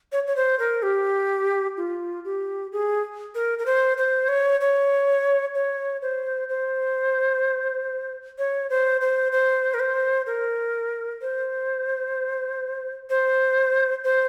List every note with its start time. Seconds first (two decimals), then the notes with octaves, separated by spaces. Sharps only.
0.12 C#5
0.27 C#5
0.36 C5
0.59 A#4
0.83 G4
1.77 F4
2.25 G4
2.72 G#4
3.35 A#4
3.59 A#4
3.66 C5
3.98 C5
4.29 C#5
4.61 C#5
5.55 C#5
6.02 C5
6.49 C5
8.38 C#5
8.70 C5
9.01 C5
9.32 C5
9.74 A#4
9.80 C5
10.26 A#4
11.22 C5
13.10 C5
14.04 C5